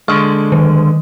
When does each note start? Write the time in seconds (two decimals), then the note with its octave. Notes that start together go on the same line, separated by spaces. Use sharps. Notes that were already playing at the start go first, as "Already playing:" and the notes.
0.08 D3 G#3 C#6 F6
0.52 D#3